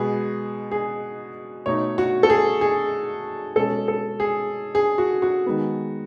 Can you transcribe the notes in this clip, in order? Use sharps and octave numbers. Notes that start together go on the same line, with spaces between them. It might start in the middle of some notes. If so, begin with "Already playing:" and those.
Already playing: B2 G#3 B3 G#4
G#4
B2 A3 D#4 C#5
F#4
A4
G#4
G#4
B2 G#3 C#4 A4
A4
G#4
G#4
F#4
F#4
D#3 G#3 B3